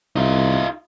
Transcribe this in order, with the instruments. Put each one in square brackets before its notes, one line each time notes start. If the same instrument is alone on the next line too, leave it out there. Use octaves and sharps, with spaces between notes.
[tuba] C2 [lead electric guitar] D#4 F4